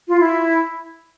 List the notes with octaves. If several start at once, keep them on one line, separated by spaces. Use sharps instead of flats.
F4
E4